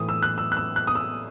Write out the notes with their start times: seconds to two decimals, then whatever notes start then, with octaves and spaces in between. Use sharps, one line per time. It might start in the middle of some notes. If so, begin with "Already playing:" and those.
Already playing: A2 E3 D#6
0.09 E6
0.23 F#6
0.38 E6
0.52 F#6
0.57 E6
0.76 F#6
0.87 D#6
0.95 E6